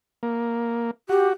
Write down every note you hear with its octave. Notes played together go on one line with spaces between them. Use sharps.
A#3
F#4 G4